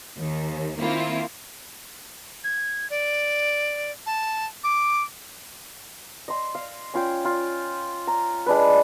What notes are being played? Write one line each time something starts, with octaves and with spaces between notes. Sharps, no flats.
D#2 D#3
D#3 A#3 C4 E4 F4
G#6
D5
A5
D6
D#5 C6
F5
C#4 F4 G5
F4
A#5
G#3 D4 B4